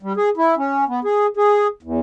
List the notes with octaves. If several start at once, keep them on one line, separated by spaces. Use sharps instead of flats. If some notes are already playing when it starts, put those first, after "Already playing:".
G3
G#4
E4
C#4
B3
G#4
G#4
E2